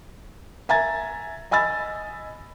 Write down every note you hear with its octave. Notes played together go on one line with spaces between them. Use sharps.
E5 G#5 A#5 G#6 A6
D#5 G#5 B5 E6 A6